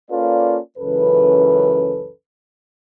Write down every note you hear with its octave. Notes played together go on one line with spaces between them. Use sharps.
A#3 C#4 F4 A4 B4 D5
C#2 F#2 E3 C#4 A4 B4